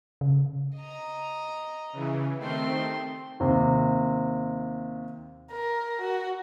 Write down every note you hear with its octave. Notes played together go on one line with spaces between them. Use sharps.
C#3
D#5 A#5
C#3 E3
D#3 A3 C4 G4 C6
D#2 C3 C4
A#4
F#4